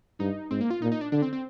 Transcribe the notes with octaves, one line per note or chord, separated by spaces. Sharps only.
G2 D#4
G#2 C4
A#3
F4
A#2 D#4
D#4
D4
D3 D4
C4
C4